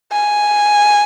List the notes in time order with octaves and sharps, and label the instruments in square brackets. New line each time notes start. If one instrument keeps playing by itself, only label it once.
[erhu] G#5